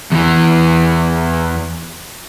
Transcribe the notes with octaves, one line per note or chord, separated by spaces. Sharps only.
E2 E3